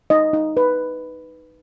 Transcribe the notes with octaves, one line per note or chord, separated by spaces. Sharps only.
D#4 D#5
D#4
B4